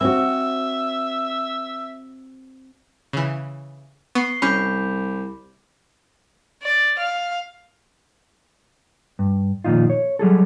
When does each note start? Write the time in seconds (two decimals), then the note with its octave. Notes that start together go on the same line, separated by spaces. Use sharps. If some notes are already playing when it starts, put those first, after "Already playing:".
0.01 C4 F#4 E5
3.13 C#3 E3
4.15 B3 C#6 C7
4.42 C2 C#4 B5 D6 G6
6.62 D5
6.98 F5
9.19 G2
9.64 F2 A#2 D#3 D#4 F4
9.90 C#5
10.19 F#3 G3 G#4 A4